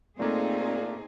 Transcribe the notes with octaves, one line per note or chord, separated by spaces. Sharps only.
A#2 A3 A#3 C4 D#4 G#4 A4